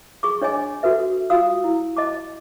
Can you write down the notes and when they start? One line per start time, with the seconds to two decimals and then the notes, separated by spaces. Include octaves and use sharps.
0.23 G#4 C#6 D6
0.42 D4 C#5 D#5 G#5 D6
0.83 F#4 A4 B4 E5
1.30 F4 F#4 F5 D#6 E6
1.64 E4
1.97 D#5 A5 D6